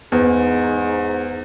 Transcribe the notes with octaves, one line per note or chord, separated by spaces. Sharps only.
E2 G#2